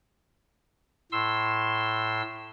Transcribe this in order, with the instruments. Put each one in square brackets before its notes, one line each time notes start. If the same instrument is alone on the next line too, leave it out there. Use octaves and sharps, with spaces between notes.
[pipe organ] A2 C6 E6